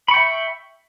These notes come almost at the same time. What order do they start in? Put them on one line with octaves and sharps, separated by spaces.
B5 C#6 G5 E5